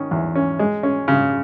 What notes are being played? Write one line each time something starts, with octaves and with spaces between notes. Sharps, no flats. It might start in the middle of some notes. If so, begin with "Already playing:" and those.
Already playing: D#3 C#4
E2
C#4
G#3
C#4
C#3